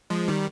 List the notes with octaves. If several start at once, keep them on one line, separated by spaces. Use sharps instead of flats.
F3 G#3
D#3 G3